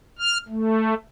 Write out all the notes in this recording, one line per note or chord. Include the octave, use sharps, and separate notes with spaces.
F6
A3